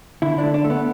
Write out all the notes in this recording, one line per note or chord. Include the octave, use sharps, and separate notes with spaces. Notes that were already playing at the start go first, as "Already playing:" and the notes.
D3 E4
A3 D4
D4
A3
B3